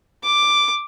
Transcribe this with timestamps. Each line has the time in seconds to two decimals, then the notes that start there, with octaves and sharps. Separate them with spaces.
0.24 D6